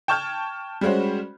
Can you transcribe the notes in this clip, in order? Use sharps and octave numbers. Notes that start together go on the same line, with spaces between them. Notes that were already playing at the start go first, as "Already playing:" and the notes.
G5 A5 C#6 F6 G6 G#6
G3 G#3 C#4 F#4 C5